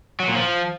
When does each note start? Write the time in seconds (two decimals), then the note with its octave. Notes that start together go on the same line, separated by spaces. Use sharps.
0.20 F#3
0.28 A#2
0.36 F3